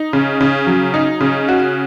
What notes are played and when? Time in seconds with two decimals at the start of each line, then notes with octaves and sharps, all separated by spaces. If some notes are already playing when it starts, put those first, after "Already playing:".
Already playing: D#4
0.13 C#3
0.41 C#3
0.67 F#3
0.94 D#4
1.21 C#3
1.48 F#4